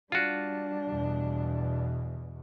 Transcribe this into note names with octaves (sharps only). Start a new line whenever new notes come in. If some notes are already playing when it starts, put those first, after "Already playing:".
G3 D4 F4 F#4
E2 B2